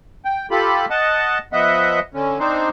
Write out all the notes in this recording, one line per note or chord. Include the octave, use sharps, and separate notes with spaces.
G5
F4 G4 A4 B5
D#5 F#5 A5
F3 B3 D#5 E5 F#5
D3 C#4
C4 D4 D#4 C5